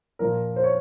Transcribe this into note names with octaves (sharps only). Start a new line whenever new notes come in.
A#2 F3 A#4
C5
C#5